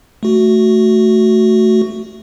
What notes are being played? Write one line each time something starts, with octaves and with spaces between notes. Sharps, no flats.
A3 F#4